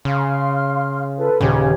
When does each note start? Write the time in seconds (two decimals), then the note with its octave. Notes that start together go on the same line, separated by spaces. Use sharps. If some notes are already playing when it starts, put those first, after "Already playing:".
0.05 C#3 F5 C6 F6
1.16 F4 A4 B4
1.41 D#1 C#3 G4 C#5